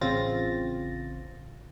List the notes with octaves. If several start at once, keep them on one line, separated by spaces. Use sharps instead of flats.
A1 C#3 C4 F4 A6 A#6